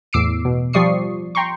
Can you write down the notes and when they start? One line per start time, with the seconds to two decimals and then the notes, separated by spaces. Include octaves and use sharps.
0.13 E2 A2 D6 E6 C7 D7
0.45 B2
0.73 F3 G3 D5 C#6 D#6 C7
1.35 G5 A#5 C6 C#6